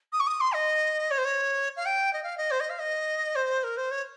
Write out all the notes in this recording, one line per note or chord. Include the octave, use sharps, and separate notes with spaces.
D#6
C#6
D#6
C6
D#5
C#5
C5
C#5
F5
G5
D#5
F5
D#5
C5
D#5
F5
D#5
C5
A#4
C5
C#5